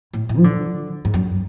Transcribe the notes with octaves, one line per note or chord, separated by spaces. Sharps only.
A2
A2
F3
D3
G#2
F#2